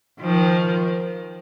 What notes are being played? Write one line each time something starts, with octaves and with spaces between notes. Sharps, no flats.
D#3 F3